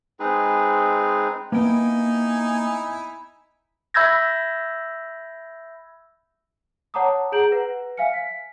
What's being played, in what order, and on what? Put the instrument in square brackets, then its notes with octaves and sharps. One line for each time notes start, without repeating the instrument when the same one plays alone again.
[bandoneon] G#3 C4 D#4 G#4 B4
[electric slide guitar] A#3 G5 [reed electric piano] B3 [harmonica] D#4 E4 G#5
[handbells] E5 B5 E6 G6 G#6 A#6
[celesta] C#5 F#5 A5 A#5 D6 D#6
G#4 F#5 A#5 G6 D7 F#7
B4 F#5 A#6
E5 F5 G#5 F6 C#7
B6